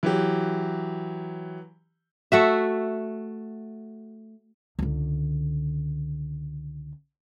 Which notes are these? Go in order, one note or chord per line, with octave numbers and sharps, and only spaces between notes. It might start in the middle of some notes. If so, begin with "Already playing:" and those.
E3 F#3 G4
A3 F#4 E5
C#2 D3